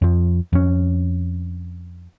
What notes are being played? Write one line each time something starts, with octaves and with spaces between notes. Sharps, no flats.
F2 F3
F2 C#4